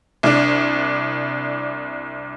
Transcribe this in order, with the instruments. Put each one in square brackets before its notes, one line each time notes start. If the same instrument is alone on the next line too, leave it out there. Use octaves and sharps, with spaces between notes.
[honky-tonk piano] C2 D4